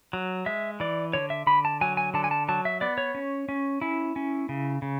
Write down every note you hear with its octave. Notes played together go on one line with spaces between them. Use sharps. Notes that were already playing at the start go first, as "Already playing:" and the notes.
F#3
G#3 E5
E3 D5
D3 C#5
E5
D3 B5
A5
F#3 G#5
G#5
D3 A5
G#5
A5
F#3 A5
E5
B3 D5
C#5
C#4
C#4
C#4 E4
C#4
C#3
C#3